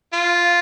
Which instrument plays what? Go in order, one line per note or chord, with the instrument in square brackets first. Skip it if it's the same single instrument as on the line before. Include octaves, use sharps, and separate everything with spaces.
[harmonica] F4